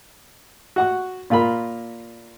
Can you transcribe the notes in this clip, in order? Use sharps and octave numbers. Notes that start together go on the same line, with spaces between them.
F#4 F#5 C#6
A#2 F4 A#4 B5